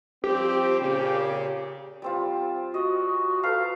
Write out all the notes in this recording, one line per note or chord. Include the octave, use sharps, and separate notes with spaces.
F3 G3 C4 G4
A#2 C#3
G3 C4 F4
F#4 D#5
A4 B4 F5 A#5